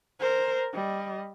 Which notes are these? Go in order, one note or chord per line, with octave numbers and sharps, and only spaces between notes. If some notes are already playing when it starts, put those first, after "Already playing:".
A#4 C5
G3 D#5